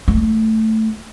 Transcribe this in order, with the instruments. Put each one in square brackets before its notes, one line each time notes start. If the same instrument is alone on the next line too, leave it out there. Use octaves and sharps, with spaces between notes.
[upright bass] A3